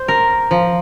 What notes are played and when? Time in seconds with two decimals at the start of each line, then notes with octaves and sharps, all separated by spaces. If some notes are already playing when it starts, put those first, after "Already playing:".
Already playing: C5
0.08 A#4
0.51 F3